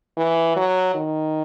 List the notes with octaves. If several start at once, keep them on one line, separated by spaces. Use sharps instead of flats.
E3
F#3
D#3